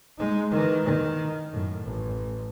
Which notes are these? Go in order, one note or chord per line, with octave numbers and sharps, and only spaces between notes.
G#3 D#4
D#3 E3
D#3
F#2 A2
A1